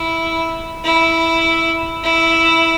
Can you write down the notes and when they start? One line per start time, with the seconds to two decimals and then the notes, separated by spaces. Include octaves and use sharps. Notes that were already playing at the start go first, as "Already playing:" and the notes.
Already playing: E4
0.84 E4
2.03 E4